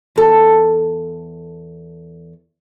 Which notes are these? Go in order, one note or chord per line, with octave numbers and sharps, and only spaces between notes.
E2 A4